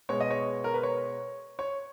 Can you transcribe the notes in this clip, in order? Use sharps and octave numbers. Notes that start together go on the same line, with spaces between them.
B2 G#3 B3 C#5
D#5
C#5
A#4
B4
C#5
C#5